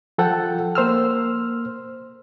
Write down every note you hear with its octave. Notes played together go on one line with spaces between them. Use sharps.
F3 A4 F#5 G5
A#3 C5 E6 F6